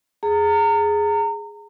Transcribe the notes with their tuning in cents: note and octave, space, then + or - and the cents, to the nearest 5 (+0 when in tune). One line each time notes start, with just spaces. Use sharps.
G#4 +0 A#5 -30